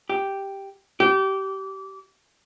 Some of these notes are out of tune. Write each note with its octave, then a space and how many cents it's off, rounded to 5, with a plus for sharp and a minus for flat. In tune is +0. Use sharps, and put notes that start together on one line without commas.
G4 +0
G4 -25